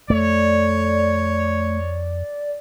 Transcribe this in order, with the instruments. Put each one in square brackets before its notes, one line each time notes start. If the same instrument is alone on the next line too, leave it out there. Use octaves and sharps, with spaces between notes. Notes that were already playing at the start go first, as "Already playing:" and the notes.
[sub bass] F2 [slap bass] A3 [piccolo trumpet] C#5 [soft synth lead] D5